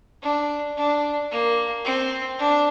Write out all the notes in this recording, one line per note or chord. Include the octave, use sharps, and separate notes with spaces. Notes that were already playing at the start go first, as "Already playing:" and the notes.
D4
D4
A#3
C4
D4